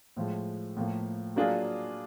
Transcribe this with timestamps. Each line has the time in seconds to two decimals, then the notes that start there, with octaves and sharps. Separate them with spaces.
0.16 A2 F3 G#3
0.76 A2 F3 A#3
1.36 F#3 A#3 D4 F4 G#4